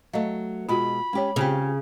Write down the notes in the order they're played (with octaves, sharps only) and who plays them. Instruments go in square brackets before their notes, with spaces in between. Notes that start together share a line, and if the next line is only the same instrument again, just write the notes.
[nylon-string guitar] F#3 A3 [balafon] D#5 F5
[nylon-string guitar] B2 G#3 [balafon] F4 F#4 [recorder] B5
[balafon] G#3 C#5 [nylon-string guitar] C#4 G4
[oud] C#3 [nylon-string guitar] C4 F4 G4